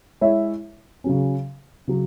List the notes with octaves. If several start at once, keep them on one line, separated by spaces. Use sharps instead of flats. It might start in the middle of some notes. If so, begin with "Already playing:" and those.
G#3 E4 C#5 E5
C#3 F#3 C#4
C#3 F#3